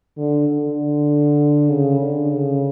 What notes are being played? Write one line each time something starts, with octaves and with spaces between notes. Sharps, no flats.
D3
D3
C#3
D3
C#3